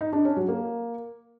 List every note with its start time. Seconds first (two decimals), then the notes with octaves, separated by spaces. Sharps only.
0.01 D#4
0.13 D4
0.25 C#4
0.37 F#3
0.49 A#3